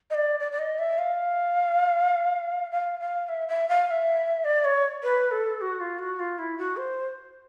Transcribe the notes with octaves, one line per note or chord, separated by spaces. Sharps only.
D#5
D5
D5
D5
D#5
E5
F5
F5
F5
E5
E5
F5
F5
E5
D5
C#5
B4
A4
F#4
F4
F#4
F4
E4
F#4
C5